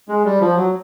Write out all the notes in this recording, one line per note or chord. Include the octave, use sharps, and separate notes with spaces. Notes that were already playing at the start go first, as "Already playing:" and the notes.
G#3
G3
F3
F#3